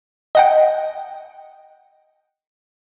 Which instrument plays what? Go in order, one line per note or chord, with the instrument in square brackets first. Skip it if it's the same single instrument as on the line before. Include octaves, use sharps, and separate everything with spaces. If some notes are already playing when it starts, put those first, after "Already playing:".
[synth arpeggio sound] D#5 F#5 G5